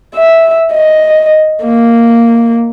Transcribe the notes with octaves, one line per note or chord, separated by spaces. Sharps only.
E5
D#5
A#3